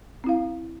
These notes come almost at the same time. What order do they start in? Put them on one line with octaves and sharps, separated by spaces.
C4 E4 F5